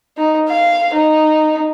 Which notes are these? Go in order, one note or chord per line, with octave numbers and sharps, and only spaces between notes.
D#4
F5
D#4